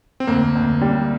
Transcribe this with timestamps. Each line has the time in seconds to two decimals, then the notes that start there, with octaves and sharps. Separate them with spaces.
0.20 C4
0.27 D2 A#3
0.55 D2
0.81 G3